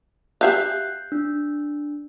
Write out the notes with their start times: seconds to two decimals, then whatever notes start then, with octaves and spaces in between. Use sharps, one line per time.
0.41 G4 E5 F5 F#6 G6 C7
1.12 D4